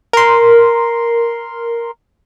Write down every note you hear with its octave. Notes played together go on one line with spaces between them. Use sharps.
A#4 C6